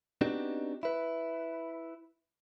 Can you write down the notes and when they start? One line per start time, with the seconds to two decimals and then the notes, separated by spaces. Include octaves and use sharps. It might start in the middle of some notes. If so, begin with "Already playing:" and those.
0.21 B3 C4 D4 D#4 F#4 G4
0.83 E4 B4